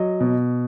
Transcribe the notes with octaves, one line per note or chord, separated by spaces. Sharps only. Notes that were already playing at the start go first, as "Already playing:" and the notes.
Already playing: F#3 D#5
B2